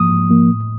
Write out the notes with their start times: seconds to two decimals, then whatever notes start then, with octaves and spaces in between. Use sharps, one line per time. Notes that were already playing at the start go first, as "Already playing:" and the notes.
Already playing: G#2 F3 A#3 D#6
0.11 G#2
0.30 F3 A#3
0.49 A2